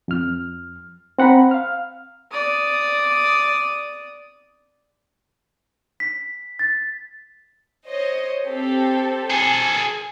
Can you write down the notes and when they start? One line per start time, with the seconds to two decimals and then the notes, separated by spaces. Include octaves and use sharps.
0.08 F2 F6
1.19 C4 F#5 A#5 B5
1.51 F5 F6
2.32 D5 D#6
6.00 B6
6.59 A6
7.87 C5 C#5 D#5
8.45 C4 G4 A4
9.30 G#4 A4 G#5